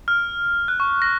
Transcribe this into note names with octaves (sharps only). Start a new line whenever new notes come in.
F6
F#6
C#6
A#6